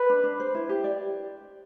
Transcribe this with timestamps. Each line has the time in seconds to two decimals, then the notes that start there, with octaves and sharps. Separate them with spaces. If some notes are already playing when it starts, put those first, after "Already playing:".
Already playing: B4
0.09 D4
0.24 D4
0.40 C5
0.55 E4
0.69 G4
0.84 D5